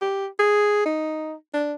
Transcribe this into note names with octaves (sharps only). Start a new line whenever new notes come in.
G4
G#4
D#4
D4